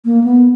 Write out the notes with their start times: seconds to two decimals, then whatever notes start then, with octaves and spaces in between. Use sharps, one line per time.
0.05 A#3
0.24 B3